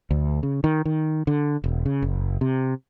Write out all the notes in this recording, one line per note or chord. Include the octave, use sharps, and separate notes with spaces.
D2
C#3
D#3
D#3
D3
E1
C#3
F#1
C3